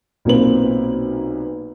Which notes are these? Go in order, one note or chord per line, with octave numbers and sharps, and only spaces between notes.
B1 A#2 A#3 C4 B4 F#7